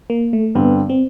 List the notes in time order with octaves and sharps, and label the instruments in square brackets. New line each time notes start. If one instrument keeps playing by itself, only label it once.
[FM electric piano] A#3
A3
[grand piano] G2 D3 G3 C4 [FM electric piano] B3
[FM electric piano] C4